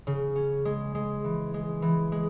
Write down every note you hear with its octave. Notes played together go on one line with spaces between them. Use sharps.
C#3
C#4
G#3
G#3
E3
G#3
E3
G#3